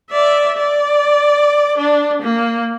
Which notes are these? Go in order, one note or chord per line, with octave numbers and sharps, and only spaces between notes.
D5 E5
D5
D4
A#3